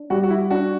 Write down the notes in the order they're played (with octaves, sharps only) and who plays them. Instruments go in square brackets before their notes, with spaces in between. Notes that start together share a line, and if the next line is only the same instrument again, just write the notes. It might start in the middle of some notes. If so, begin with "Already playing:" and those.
Already playing: [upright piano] D4
[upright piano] G3 [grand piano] F#4
[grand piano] F#4
E4
[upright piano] D4 [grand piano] F#4